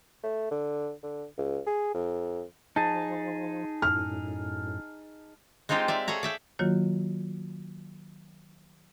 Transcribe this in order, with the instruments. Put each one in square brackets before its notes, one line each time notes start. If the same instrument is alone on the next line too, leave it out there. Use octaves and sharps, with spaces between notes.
[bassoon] A3
D3
D3
C#2
G#4
F2
[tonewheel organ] F3 [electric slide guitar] D#4 G#4 [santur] A5
[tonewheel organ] F#2 A2 [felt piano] F6
[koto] G#3 C4 D#4 F4 G4
D5 E5 F5
G#4 A4 C#5 A#5
D5 E5 G5
[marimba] D#3 F#3 A#3 F4 F#4 C#5